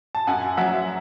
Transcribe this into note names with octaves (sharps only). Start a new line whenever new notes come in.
A5
F#2 F#5 G#5
F#3 E5 F#5